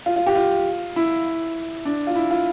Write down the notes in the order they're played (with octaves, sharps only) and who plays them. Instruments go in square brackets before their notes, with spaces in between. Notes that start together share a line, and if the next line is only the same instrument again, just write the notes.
[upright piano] F4
F4
G4
F4
E4
D4
F4
E4
F4